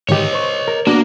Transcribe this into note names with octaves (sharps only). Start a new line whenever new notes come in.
G#2 D#3 G4 C#5 D#5
C5 C#6
A#4
A#3 B3 D4 F#4